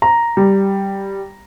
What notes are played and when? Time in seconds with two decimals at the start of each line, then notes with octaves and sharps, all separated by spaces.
0.02 A#5
0.37 G3